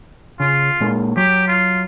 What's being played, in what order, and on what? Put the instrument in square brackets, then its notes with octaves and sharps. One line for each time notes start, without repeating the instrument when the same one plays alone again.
[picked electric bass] C#3 [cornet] F4
[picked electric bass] A#2 G#3 A#3
[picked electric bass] F#3 [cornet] G4
[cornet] F4